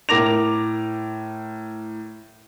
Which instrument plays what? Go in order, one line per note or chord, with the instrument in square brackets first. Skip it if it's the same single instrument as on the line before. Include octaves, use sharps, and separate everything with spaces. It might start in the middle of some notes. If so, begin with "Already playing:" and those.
[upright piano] A2 A#4 D6 A#6 F7